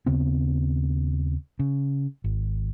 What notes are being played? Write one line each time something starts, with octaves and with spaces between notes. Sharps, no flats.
D#2 C#3 B3 C4
C#3
G#1